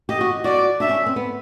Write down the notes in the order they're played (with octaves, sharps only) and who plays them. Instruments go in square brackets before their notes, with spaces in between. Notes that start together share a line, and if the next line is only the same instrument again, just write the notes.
[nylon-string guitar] G4 [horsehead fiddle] D#5
[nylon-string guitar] F#4
[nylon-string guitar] F#4 [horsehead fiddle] D5
[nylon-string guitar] D4 [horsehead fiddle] E5
[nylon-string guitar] C#4
C4
B3